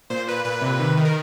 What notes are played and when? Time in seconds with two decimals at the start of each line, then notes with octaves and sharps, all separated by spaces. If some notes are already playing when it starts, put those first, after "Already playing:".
0.10 A#2 C5
0.27 A#2 B4
0.45 A#2 B4
0.62 C3
0.79 D#3
0.97 D#3
1.05 A#4